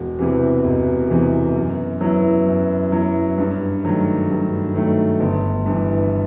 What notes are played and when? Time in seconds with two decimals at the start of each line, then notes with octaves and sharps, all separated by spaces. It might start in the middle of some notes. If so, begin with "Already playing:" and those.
Already playing: E1
0.19 E2 C3 E3
0.64 E1
1.10 E2 C3 E3
1.56 F#2
2.01 F#3 B3 E4
2.46 F#2
2.92 F#3 B3 E4
3.38 G2
3.83 D#3 F#3 A3
4.30 G2
4.74 D#3 F#3 A3
5.20 G1
5.65 G2 E3